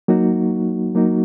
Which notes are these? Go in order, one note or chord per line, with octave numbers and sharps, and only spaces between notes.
F#3 A#3 D#4 F#4
F#3 A#3 D#4 F#4